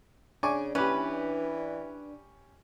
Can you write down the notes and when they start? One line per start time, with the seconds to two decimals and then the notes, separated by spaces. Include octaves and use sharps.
0.43 C#3 D4 D5 G#5 C#6 D6
0.75 E3 C#4 G4 B4